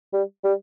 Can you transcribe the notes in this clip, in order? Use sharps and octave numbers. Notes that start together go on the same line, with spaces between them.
G3
G3